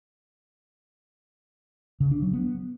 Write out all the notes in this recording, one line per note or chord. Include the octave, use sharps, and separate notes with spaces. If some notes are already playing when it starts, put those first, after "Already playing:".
C#3
D4
F#3
B3